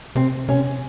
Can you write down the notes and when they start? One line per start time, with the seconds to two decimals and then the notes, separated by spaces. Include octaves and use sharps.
0.15 C3 C4
0.49 C3 C#4